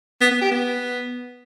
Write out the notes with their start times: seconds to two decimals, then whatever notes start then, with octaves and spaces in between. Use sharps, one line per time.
0.21 B3
0.31 B3
0.41 G4
0.51 B3